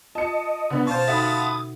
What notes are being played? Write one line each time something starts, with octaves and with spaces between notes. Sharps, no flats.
F4 D#5 A5 C#7
D3 B3 C#4
B2 D3 C#4 F4 C5 A5 C#6
D#4 F#4 A4 E5 F#5 B5 D#6 A6